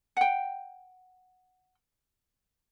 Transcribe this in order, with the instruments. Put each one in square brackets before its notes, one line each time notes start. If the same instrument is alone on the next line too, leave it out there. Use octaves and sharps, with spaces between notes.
[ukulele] F#5 G5